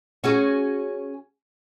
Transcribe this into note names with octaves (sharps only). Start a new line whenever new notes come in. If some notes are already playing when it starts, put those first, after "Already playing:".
C#4 F#4 G#4